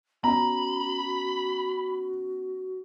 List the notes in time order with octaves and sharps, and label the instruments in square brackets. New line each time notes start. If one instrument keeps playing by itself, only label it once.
[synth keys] B3 C#4 [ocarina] F#4 [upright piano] A#5 [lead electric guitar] B5